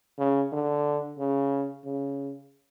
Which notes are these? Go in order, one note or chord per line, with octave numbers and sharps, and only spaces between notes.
C#3
D3
C#3
C#3